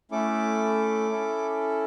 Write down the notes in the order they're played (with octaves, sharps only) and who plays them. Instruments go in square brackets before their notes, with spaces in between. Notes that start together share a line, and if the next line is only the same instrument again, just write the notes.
[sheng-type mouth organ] A3 C#4 E4 A4 D6
C#4 E4 A4